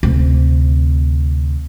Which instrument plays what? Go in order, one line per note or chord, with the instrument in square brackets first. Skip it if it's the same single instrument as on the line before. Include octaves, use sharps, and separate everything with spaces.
[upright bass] D2 C3